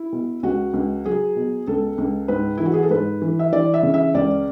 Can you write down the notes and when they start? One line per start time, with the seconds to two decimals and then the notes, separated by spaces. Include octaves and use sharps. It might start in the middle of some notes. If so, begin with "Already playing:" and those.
Already playing: E4
0.12 B2
0.43 C#2 F#4
0.74 C#2
1.05 F#3 G#4
1.36 B2
1.67 C#2 A4
1.98 C#2
2.28 G#2 B4
2.57 E3 E4
2.66 F#4
2.74 G#4
2.83 A4
2.90 G#2 B4
3.22 E3
3.39 E5
3.52 E3 D5
3.74 E5
3.83 C#3
3.94 E5
4.14 C#2 D5